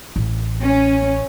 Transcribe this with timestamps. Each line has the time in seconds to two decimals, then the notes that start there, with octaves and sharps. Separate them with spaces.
0.16 A1
0.61 C#4